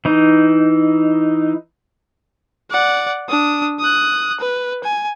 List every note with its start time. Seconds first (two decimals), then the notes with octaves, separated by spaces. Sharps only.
0.05 E3 D#4
2.71 D5 F#5
3.29 D4 D#6
3.79 D#6 F#6
4.40 B4
4.84 G#5